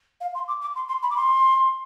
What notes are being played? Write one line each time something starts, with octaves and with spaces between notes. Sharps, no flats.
F5
C6
D6
D6
C6
C6
B5
D6
C6